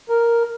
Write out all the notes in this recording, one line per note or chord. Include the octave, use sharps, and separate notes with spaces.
A#4